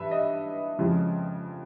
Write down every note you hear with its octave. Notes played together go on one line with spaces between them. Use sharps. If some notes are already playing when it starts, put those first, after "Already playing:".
Already playing: G2 E3 B4 E5
D#5
F2 C#3 F3 G#3